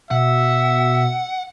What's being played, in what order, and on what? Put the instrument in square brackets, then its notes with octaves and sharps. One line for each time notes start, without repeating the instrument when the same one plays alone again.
[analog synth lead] B2 [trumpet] E5 [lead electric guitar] F#5